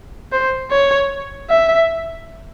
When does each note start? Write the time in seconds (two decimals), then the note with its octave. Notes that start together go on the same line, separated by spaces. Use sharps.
0.32 C5
0.71 C#5
1.50 E5